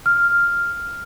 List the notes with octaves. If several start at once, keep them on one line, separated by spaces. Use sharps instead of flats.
F6